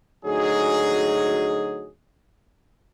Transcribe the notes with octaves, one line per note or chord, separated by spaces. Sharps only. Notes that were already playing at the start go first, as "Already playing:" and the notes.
D2 F#3 D#4 G#4